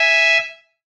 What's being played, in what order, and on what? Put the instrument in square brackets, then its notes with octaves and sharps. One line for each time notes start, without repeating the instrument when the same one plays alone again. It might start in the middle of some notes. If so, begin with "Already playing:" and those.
Already playing: [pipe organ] E5 G#5